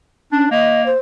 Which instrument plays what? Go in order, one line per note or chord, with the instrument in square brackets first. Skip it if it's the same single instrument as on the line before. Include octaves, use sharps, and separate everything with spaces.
[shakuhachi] C#4 [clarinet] D4
[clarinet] A#3 [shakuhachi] D#5
[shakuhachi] C5